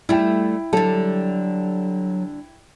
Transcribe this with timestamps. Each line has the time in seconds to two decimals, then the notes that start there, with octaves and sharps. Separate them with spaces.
0.09 G3 A3 E4 G5
0.73 D3 F#3 G3 A4